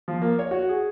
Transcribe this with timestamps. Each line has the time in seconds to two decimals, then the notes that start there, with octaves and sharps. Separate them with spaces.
0.08 F3
0.22 A#3
0.39 C#5
0.51 F#4
0.69 G#4